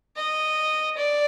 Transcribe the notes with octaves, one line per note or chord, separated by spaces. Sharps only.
D#5
D5